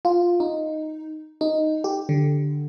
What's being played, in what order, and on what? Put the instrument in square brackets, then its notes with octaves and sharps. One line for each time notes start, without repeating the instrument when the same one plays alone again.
[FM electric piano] F4
D#4
D#4
G4
D3